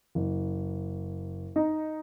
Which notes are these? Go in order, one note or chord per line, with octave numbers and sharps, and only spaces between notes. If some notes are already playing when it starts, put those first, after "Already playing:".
F#1
D#4